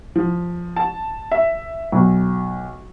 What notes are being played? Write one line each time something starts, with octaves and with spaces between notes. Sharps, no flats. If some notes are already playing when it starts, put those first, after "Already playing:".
F3
A5
E5
B1